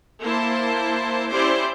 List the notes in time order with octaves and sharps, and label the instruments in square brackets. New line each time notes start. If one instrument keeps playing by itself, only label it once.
[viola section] A#3 E4 C5 A5
C#4 E4 G4 C5 D5